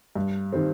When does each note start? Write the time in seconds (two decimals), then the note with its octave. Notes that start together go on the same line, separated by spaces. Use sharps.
0.15 G2
0.53 D#3 G3 C4